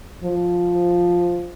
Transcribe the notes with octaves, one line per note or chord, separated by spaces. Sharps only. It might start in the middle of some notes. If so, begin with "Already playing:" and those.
F3